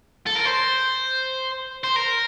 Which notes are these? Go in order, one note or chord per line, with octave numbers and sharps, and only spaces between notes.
A4
A#4
C5
C5
A#4